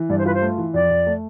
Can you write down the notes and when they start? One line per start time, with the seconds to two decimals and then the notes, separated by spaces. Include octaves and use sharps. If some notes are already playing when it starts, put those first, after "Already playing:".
Already playing: E3
0.09 G2 D5
0.18 C5
0.26 F4 B4
0.34 C5
0.42 A3
0.58 E3
0.74 F2 D5
0.90 F2
1.07 A3